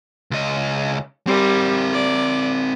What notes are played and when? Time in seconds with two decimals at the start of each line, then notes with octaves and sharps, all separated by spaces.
0.31 C#2 D#5
1.27 G3 C4 A#4
1.93 D5